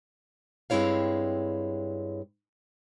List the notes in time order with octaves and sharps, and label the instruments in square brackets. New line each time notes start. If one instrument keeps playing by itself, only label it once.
[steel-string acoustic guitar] G2 G#3 C4 E4 C#5 F5